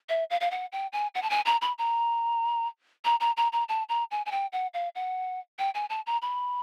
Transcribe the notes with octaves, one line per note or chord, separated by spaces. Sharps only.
E5
F5
F5
F#5
G5
G#5
F#5
A5
G#5
A#5
B5
A#5
A#5
A#5
A#5
A#5
A5
A#5
G#5
G#5
G5
F#5
F5
F#5
G5
G#5
A5
A#5
B5